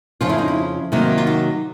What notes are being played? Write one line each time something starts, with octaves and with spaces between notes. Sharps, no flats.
F2 C#3 F3 F4
E4
D#4
E4
C3 D#3 F#3 A#3
F4
F#4